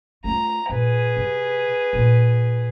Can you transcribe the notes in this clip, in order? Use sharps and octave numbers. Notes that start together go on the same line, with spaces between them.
A3 F4 A#5
A#2 G#4 B4
C3
A#2 B3